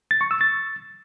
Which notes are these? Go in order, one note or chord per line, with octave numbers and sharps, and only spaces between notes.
A6
C#6
E6
A6